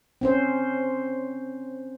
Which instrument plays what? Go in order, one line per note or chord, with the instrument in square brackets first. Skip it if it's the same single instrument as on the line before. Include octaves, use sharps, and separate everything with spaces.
[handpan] C4 C#4 C5